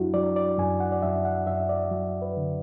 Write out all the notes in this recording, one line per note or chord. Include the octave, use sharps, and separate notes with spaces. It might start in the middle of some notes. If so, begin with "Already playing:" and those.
Already playing: F#2 F#3 D4 E4 F#4
F#3 D5
D5
F#2 G#5
F#5
D5
F#2 E5
F#5
F#2 E5
D5
F#3
B4
D3